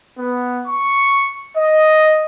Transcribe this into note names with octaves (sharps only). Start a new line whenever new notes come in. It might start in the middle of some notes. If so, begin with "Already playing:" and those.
B3
C#6
D#5